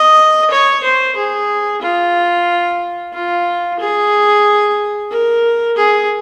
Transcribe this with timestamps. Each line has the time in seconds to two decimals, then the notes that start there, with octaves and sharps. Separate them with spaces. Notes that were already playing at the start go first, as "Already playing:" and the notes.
Already playing: D#5
0.50 C#5
0.83 C5
1.16 G#4
1.82 F4
3.13 F4
3.80 G#4
5.11 A#4
5.77 G#4